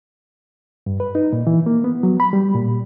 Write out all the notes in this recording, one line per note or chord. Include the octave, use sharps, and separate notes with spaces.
G2
B4
D#4
A#2
E3
A#3
B3
F#3
B5
G3
A#2